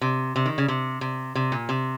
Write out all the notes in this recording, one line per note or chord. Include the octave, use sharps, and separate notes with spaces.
C3
C3
D#3
C#3
C3
C3
C3
A#2
C3